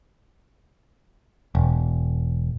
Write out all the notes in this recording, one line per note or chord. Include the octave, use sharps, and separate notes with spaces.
E1